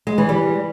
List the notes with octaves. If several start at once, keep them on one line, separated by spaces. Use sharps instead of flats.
G#3
E3
G3